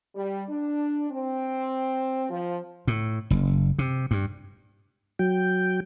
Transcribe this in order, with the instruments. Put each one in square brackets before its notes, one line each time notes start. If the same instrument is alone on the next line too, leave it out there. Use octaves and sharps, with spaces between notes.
[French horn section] G3
D4
C4
F3
[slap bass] A2
F#1
C3
G2
[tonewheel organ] F#3 G5